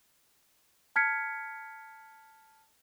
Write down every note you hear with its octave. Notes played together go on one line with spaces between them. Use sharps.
A5 F6 G#6 B6 C#7